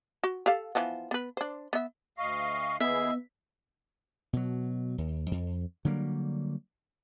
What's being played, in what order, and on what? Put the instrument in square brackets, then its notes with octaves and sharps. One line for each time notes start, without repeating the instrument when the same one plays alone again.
[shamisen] F#4
G4 A4 F5
E3 F3 B3
B3 B4
D4 C5
B3 E5
[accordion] D2 D#5 F5 [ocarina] C#6
[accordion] D#2 E4 G#4 [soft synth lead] B3 [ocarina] D#5 [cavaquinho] E5
[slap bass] B2 F#3
D#2
F2
D3 F#3 G3 A#3